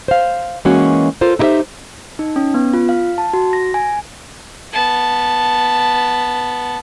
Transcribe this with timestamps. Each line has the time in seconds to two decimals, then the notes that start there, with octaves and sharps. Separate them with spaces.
0.08 C5 F5
0.65 E3 G#3 A#3 C#4 F#4
1.21 F4 A4 A#4 C5
1.39 D#4 E4 G4 A#4 C5 E5
2.19 D#4
2.36 C#4
2.54 B3
2.74 F4
2.89 F5
3.18 A5
3.33 F#4
3.53 A#6
3.74 G#5
4.73 B3 A5